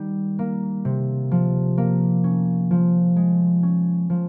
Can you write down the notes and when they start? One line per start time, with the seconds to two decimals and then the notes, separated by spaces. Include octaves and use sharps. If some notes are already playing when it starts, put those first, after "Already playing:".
Already playing: D#3 G3
0.39 A#3
0.85 C3
1.31 F3
1.78 A#3
2.24 C#4
2.71 F3
3.16 G#3
3.63 C#4
4.10 F3